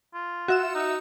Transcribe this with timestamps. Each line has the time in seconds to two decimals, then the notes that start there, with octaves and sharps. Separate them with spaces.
0.14 F4
0.48 F#4 E5 E6
0.75 D#4